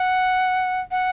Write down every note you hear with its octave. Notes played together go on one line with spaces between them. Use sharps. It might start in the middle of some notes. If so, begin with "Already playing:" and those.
Already playing: F#5
F#5